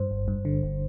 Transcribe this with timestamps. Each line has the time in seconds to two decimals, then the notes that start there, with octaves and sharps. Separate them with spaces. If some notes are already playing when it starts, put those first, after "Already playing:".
Already playing: G2 C5
0.11 G1
0.28 G2
0.45 D3
0.63 G1